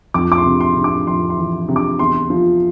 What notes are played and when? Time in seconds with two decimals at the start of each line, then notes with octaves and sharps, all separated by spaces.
0.14 F2 D6
0.32 D6
0.38 C6
0.46 C3
0.60 C6
0.76 C3
0.84 D6
1.07 F2 C6
1.30 C6
1.38 E3
1.68 C3
1.76 D6
1.99 E2 C6
2.30 F3